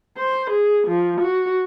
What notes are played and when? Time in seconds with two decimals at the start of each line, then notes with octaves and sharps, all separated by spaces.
0.18 C5
0.50 G#4
0.88 F3
1.21 F#4